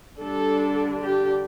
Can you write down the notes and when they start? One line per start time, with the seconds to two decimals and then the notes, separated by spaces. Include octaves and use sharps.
0.22 D3 G3 D4 A4
1.01 G4